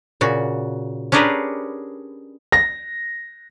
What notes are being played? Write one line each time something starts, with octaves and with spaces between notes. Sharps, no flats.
A#2 C#3 F#4
C#4 D4 G4 G#4 A#4 B4
A#6